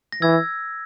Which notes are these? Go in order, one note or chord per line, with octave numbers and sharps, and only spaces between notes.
A#6
E3 E6 G#6